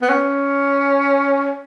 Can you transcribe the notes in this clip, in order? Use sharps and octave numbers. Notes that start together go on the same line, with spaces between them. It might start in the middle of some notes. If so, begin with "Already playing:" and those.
B3
C#4